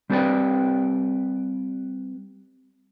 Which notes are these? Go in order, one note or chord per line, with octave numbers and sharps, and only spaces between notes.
G3 C4 G4 B4 D5 G5